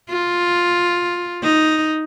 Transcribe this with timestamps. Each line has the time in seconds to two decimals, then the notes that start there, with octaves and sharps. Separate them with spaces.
0.10 F4
1.43 D#4